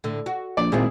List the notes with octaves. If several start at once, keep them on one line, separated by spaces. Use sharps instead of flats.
A2 D3
F#4
A#1 D5
G#1 A#2 C4 E4 F4 G#4